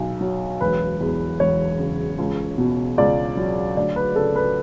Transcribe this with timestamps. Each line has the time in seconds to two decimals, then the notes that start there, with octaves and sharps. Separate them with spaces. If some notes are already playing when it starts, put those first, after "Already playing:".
Already playing: B1 B2
0.21 F#3
0.61 E1 B4
1.01 E2
1.40 E1 C#5
1.79 C#3
2.18 C#2
2.58 B2
2.98 C#2 D5
3.37 F#3
3.77 D2 D5
3.96 B4
4.16 C#3 A4
4.36 B4